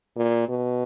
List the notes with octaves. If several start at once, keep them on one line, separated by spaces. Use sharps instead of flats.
A#2
B2